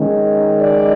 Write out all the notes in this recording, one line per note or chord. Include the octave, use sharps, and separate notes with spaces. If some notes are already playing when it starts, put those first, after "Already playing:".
Already playing: D#3 G#3 C#4
D5